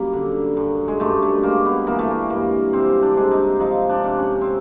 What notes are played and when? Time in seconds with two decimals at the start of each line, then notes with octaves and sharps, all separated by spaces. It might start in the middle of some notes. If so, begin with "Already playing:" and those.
Already playing: F#2 G3 A#3
0.13 D3
0.57 F#2
0.88 G#3
1.00 G2 A3
1.22 A3
1.43 G#3 A#3
1.65 B3
1.87 E3 A#3
1.99 A3
2.11 A#3
2.30 G2 A#3
2.73 C3 C4
3.02 D4
3.17 G#3
3.31 D#4
3.60 F3 D#4
3.89 D4
4.04 C3
4.18 C#4
4.41 C4